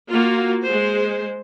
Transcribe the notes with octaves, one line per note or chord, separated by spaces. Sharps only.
A#3 F4 F#4
G#3 C5